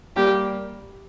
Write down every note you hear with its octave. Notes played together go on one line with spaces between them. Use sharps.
G3 A#3 G4